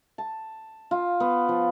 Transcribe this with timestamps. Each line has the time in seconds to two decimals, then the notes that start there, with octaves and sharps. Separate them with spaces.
0.18 A5
0.91 F4
1.20 B3
1.49 F3